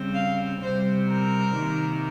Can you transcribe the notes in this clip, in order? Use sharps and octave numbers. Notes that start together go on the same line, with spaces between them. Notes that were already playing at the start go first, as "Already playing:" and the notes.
Already playing: C#3 G3 C4
F5
C3 G3 C4 C5
A#4
C3 D#3 A#3